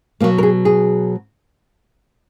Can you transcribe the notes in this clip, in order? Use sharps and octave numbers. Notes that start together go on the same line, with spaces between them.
B2 F#3 A#3
A#4
G#4
G#4